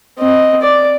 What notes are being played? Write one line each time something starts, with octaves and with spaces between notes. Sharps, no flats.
C4 D#5
D5